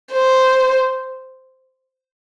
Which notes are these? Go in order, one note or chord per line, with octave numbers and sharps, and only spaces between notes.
C5